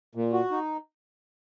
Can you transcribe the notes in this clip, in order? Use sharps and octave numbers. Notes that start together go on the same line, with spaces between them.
A#2
F#4
D#4